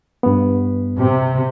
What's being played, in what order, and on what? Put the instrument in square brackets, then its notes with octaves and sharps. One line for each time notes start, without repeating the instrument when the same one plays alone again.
[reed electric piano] G2 B3
[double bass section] C3